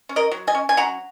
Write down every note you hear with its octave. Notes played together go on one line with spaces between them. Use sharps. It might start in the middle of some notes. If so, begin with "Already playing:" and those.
C#4
A#4 D#5
F#3
D#5 G#5
C#4
G#5
F#3 F#5 A#5